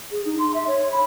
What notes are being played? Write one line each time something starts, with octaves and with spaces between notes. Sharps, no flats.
G#4
D#4
C6
E5
C#5
B5